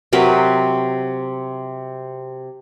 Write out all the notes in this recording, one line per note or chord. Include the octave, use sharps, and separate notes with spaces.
C3 F#3 A#4 B4